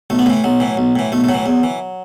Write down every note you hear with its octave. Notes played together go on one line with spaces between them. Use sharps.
B1 A3
B3
A2 E3 A3
B1 F#3
A2 E3
B1
A2 E3
B1 A3
A3
A2 F#3
E3
E2
E3